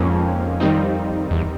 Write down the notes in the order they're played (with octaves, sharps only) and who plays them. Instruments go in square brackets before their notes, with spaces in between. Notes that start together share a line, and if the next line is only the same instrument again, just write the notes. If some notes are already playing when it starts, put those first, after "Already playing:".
Already playing: [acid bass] F2 [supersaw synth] G#2 F3 A#3 C#4
[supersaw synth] D#3 G3 C4 D#4
[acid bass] E2